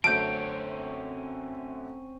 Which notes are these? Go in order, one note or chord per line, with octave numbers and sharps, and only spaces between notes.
F#2 D3 A3 C4 C#4 A5 G6 D7